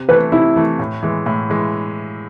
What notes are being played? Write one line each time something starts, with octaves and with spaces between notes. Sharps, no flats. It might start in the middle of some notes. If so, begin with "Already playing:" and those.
Already playing: C3
E3 A3 B4
C3 E4
E3 A3
A2
E3 G#3
A2
E3 G#3